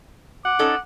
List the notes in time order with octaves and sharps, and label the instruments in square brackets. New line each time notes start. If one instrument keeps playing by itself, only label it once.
[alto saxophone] F#5 [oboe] D6
[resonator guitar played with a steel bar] C#4 D#4 A4